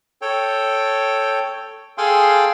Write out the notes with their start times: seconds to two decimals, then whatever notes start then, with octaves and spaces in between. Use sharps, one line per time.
0.22 A4 C#5 G5
1.98 G#4 A4 F5 G5 G#5 C6